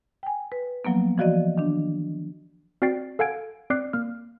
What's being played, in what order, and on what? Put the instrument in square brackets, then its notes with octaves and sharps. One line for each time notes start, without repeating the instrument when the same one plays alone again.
[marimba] G5 G#5
B4
F3 F#3 A#3 B3
E3 F3 F#4 D5 D#5
D#3 D4
[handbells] C4 F#4 D5 G5 A6 C7
A4 F5 F#5 G#5 G#6 D7
C4 D5 D6 F#6 C7
A#3 F6